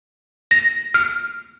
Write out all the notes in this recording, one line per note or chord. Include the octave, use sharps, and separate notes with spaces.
A#6
F6